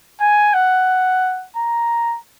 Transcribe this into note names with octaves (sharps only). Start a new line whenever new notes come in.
G#5
F#5
A#5